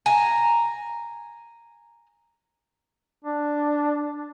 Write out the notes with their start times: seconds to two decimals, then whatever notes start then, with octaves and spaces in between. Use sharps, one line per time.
0.06 G#5 A#5
3.25 D4